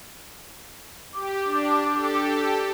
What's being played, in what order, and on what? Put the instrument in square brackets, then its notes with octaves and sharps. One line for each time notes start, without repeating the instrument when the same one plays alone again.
[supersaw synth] G4 [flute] D6
[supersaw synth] D4
G4 A4